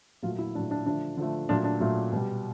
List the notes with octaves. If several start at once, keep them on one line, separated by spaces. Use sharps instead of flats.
A#2 F#3 A3 F4
E4
A#2 F#3 A3 D4
D4
D3 F3 A3 D4
D3 F3 A3
A#2 F#3 A3 D4
D4
A#2 F#3 A3
B2 G3